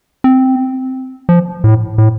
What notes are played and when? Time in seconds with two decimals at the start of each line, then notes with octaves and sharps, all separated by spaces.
0.24 C4
1.29 F3
1.64 A2
1.98 A2